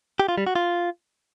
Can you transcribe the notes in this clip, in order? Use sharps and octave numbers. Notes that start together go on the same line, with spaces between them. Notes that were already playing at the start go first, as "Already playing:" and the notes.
G4
F4
G3
F#4
F4